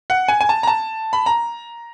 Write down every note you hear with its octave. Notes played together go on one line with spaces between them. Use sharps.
F#5
G#5
G#5
A5
A#5
A5
B5
A#5